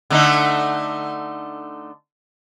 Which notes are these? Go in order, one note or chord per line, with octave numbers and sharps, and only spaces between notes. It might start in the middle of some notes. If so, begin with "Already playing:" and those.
D3 A3 D#4